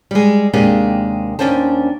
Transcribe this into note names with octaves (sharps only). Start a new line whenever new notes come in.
G3 G#3
D#2 C3 G#3 A#3 D4 G4
D#2 F3 C#4 D4 C5 A5